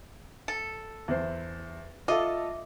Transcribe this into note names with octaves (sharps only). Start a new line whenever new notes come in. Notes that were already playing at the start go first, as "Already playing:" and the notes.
A4
E2 C5
F4 A4 D#5 E5 D6